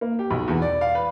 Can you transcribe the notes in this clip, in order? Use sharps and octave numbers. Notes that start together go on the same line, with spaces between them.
A#3
G4
B1
E2
D5
F5
B4